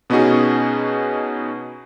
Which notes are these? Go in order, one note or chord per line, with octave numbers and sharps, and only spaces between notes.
B2 B3 C#4 D#4 F#4 G#4